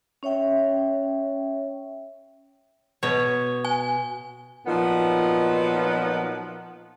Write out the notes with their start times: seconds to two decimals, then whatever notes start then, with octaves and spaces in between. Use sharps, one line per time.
0.23 C#4 C#5 E5 G5
3.03 B2 C#5
3.65 G#5
4.67 A#2 F3 F#3 B3 D#4 F#5